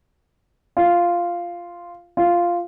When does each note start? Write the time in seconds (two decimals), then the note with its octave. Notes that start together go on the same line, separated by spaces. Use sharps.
0.77 F4
2.17 F4